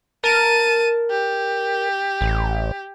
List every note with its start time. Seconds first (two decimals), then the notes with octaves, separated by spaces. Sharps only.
0.24 A#4 A5 D#7
1.10 G4
2.21 A1